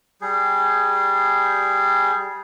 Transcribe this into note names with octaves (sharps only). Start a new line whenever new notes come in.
G3 G#4